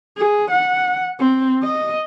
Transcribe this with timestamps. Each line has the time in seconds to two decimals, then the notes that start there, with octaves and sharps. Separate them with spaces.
0.18 G#4
0.51 F#5
1.20 C4
1.63 D#5